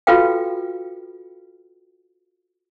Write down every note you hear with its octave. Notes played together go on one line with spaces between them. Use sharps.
F4 F#4 A4 B4 F5 G5